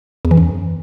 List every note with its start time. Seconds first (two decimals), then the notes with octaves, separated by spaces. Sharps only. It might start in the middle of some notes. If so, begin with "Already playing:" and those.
0.25 E2
0.31 E3
0.37 F#2